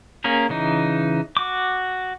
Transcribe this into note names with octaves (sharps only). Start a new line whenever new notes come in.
A#3 C#4 G#4 A#4
C#3 E3 D#4
F#4 D6